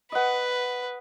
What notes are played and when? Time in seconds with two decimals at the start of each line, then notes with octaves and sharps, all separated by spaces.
0.12 B4 D#5 F#5